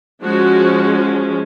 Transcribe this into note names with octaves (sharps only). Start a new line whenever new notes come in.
F3 G#3 C#4 F#4